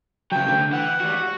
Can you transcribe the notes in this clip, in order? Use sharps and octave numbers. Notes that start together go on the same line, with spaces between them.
C#3 F#3 G5
D2 D3
E3 F#5
G3 F#4
F#4